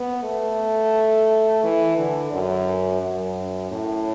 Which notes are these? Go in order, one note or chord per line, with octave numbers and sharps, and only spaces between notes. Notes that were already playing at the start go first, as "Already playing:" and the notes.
Already playing: B3
A3
E3
D3
F#2
F#2
A2